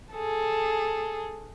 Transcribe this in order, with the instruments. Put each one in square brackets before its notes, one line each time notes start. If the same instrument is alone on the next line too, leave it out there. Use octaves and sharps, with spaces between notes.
[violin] G#4 A4